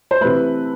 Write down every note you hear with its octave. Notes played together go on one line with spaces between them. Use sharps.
C5
C3 E3 A3 B4